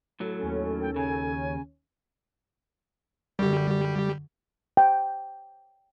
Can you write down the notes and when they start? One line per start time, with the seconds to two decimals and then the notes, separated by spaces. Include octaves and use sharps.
0.20 A2 F#3 A4
0.38 D#2 C#4
0.81 G5
0.96 C#3 G#5
3.39 F#2 D3 G3 G4
4.77 G5